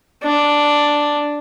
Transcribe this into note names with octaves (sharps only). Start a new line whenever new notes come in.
D4